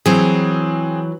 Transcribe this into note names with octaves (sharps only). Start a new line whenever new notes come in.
E3 F#3 C4 G#4